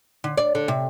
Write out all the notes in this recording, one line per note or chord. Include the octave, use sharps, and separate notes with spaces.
D3
D5
D3
C3